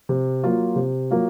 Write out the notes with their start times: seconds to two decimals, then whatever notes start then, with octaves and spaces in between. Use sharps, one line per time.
0.09 C3
0.44 F#3 A#3 F4
0.76 C3
1.10 F#3 A#3 F4